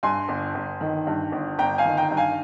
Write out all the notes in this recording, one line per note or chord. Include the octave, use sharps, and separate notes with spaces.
G2 G#5 C6
G1
G1
D#3
G2
G1
G1 G5 A#5
F5 G#5
D#3
G5 A#5
G2
F5 G#5